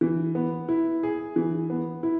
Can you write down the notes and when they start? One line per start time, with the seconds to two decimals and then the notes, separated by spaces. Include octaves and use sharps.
0.01 E3
0.35 B3
0.69 E4
1.03 G#4
1.36 E3
1.70 B3
2.03 E4